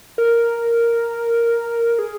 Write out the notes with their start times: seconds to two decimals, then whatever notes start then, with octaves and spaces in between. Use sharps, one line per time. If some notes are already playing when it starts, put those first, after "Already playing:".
0.18 A#4
1.99 G#4